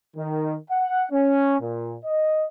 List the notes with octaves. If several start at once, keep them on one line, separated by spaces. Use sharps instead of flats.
D#3
F#5
C#4
A#2
D#5